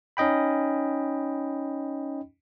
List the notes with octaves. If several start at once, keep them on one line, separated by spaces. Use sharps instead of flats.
C#4 D#4 D#5 G5 B5